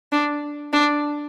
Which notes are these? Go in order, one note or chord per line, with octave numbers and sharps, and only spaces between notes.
D4
D4